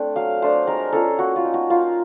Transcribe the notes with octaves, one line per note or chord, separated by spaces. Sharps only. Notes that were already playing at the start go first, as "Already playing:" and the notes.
Already playing: A3 C4 D4
F#3 F5
A3 D4 C5
G#3 A#4
C#4 F4 A4
A#3 F#4
F4
D#4
F#4
A#3 F4